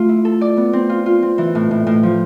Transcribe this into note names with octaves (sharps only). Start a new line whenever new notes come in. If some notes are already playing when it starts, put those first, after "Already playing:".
Already playing: A3 F4
E4
A4
D5
B3
C4
F4
F4
C4
E3
A2
A2
A2
F3